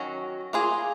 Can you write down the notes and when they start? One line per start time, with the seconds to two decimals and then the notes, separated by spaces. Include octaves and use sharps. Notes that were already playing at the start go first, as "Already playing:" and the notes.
Already playing: D#3 F#3 C#4 F#4
0.53 A#3 F4 G#4